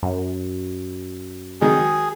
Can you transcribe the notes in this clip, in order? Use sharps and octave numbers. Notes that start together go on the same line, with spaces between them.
F#2
D#3 F#3 G#3 G#4